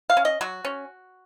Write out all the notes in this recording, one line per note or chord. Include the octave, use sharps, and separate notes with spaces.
F5
C#4
D#5
F#3 F#4
C#4